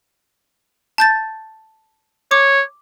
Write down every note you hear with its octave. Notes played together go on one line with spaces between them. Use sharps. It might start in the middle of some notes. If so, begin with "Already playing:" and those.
A5 G6 A6
C#5 D6